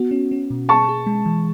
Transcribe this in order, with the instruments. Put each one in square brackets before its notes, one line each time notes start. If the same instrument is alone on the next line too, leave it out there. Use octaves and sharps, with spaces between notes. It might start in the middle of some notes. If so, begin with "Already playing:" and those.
Already playing: [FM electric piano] B3 F#4
C#4
C#4
B2
[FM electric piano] G#4 [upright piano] A5 C#6
[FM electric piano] G#4
G#3
E3